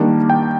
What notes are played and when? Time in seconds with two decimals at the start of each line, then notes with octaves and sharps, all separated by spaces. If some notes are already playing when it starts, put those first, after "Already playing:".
Already playing: D#3 G3 A#3 D4
0.30 G5